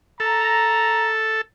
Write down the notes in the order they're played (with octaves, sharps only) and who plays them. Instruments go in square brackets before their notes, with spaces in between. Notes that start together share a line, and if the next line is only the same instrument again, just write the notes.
[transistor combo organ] A4 [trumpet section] A#5